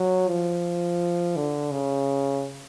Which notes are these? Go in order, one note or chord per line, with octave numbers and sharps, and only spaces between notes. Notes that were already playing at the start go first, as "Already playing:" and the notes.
Already playing: F#3
F3
D3
C#3